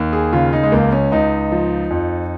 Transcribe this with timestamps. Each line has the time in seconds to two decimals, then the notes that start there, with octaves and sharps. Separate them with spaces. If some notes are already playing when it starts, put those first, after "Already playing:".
Already playing: D#2
0.13 G#4
0.33 C#3 F4
0.53 D#4
0.63 G#3
0.72 C#2 A#3
0.92 C#4
1.12 C#2 D#4
1.52 F3
1.91 F2